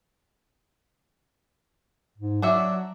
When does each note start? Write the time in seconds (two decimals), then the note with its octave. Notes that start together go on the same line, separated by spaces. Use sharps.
2.18 G#2
2.42 F#3 D4 F#4 E5